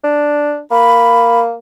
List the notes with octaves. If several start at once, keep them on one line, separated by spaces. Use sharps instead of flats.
D4
A#3 B5